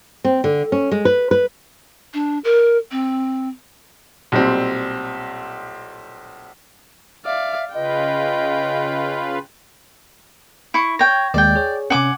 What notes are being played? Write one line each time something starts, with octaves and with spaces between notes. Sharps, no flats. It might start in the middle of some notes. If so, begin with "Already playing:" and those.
C4
D3
C#4
G#3
B4
B4
D4
A#4
C4
B1 A#2 G3 C4
D5 E5 F5
C#3 F4 B4 D#5 G5
E4 C#6
C#5 G5 A#6
D#2 G#3 D5 G5
G#4 C#5
C3 C#4 F#5 G#5 D6